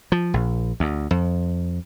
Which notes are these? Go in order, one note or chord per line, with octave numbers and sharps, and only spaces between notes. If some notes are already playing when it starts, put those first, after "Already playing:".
F3
A#1
D2
F2